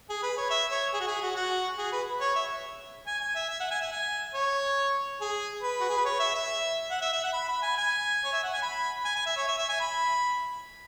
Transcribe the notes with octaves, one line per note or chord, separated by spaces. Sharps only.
G#4
B4
C#5
E5
C#5
G#4
F#4
G#4
F#4
F#4
G#4
B4
C#5
E5
G#5
G#5
E5
E5
F#5
G#5
E5
G#5
C#5
G#4
B4
F#4
G#4
B4
C#5
E5
E5
F#5
E5
E5
F#5
B5
B5
G#5
G#5
C#5
E5
F#5
G#5
B5
G#5
G#5
E5
C#5
E5
E5
G#5
B5